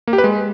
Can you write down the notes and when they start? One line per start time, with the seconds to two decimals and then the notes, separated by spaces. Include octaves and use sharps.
0.07 A#3
0.13 G4
0.18 B4
0.24 G#3